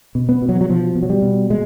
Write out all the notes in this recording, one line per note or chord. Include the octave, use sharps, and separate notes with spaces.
B2
B3
B2
F#3
F#3
B2 F3
B2
F#3
G3
B2
A#2 G#3